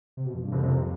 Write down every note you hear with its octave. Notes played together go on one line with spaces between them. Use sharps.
C3
B2
F2
G2
C2 F2 C3
C2 C3
C3